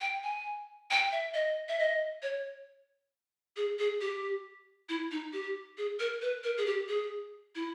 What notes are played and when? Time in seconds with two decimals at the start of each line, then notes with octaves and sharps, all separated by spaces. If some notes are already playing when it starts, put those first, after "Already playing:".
0.01 G5
0.24 G#5
0.91 G5
1.12 E5
1.34 D#5
1.69 E5
1.79 D#5
2.23 C#5
3.57 G#4
3.79 G#4
4.01 G4
4.89 E4
5.11 D#4
5.33 G4
5.78 G#4
6.00 A#4
6.22 B4
6.44 A#4
6.57 G#4
6.66 G4
6.89 G#4
7.55 E4